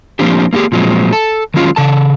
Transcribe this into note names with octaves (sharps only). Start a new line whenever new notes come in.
F3 A#3 C4 D4 G4
A#3 E4 F4 G4 G#4
A#2 F3 F#3 G#3 C4
A4
D#3 F#3 G#3 C#4 F4
C#3 A4 A5